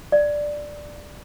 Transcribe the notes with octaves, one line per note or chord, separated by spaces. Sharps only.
D5